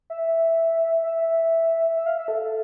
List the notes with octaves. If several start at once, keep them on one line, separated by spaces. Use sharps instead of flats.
E5
E5
E5
F5
E5
A4